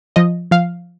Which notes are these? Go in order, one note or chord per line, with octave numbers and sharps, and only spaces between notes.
F3 D#5
F3 F5